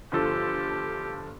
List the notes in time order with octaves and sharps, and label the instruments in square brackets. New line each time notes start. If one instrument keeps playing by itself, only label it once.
[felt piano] G1 F3 A4 [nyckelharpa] G4